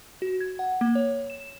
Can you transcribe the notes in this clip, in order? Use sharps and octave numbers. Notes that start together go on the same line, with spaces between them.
F#4
G#6
F#5
A#3
C#5
E7